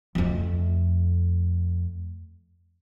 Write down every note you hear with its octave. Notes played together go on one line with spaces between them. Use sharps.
F2 A3